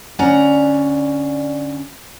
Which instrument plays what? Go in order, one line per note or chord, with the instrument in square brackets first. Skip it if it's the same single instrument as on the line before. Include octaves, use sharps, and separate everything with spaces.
[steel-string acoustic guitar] D2 C#4 D5 F#5 A#5